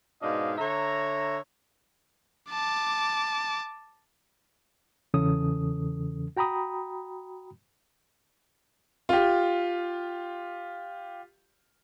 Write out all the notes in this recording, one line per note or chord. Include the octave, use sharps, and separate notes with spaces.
G#2 B2 D4 D#5 F5
D3 C#5 E5 A#5
A5 D6
E2 C#3 E3 C#4 A4 D#6
F#4 G5 A#5 B5 D#6
F4 G4